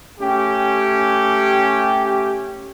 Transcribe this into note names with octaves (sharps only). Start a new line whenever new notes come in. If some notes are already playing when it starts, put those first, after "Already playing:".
A3 C#4 G4